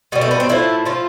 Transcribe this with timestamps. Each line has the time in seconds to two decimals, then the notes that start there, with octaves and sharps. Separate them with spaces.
0.12 B2 B3
0.15 G3
0.21 A3
0.31 B3
0.40 C4
0.49 A2 F3 A3 E4
0.85 A2 F3 A3 F4